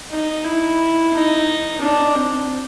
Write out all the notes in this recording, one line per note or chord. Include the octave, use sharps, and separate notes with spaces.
D#4
E4
D#4
D4
C4